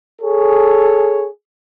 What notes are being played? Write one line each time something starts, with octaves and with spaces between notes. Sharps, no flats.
G#4 A4 C#5